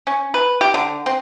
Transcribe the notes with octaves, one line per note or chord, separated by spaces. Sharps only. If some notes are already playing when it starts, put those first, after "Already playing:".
C#4
B4
G4
D3
C4